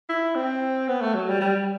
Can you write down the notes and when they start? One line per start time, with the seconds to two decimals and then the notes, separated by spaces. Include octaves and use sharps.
0.09 E4
0.36 C4
0.88 B3
1.01 A3
1.14 F#3
1.28 G3
1.41 G3